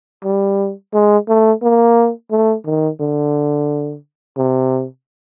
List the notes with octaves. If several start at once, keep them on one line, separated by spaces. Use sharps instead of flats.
G3
G#3
A3
A#3
A3
D#3
D3
C3